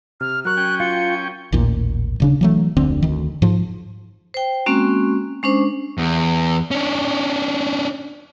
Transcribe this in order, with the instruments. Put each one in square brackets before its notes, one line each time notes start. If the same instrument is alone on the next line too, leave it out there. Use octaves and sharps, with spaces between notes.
[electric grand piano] C3 [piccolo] F6
[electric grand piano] F#3 A#4 C#6 [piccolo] F#6
[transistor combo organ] C#4 G5
[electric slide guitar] F4 [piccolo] C#7
[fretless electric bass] A1 D#2 A#2
D#1 C#3 D4
E3 F#3 A3
F1 D2 D3 C4
D2 D#3
G#2 F3
[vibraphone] C5 G5
G#3 A#3 C4 C#4 F#4
G#3 C#4 D4 C5
[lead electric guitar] E2
C#4 D4